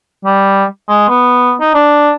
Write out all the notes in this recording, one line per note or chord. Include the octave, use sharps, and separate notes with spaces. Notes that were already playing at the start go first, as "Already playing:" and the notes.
G3
G#3
B3
D#4
D4